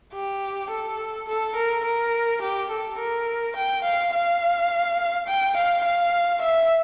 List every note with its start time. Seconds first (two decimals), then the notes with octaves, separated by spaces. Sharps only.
0.13 G4
0.70 A4
1.28 A4
1.56 A#4
1.85 A#4
2.42 G4
2.71 A4
2.99 A#4
3.56 G5
3.84 F5
4.14 F5
5.27 G5
5.57 F5
5.85 F5
6.42 E5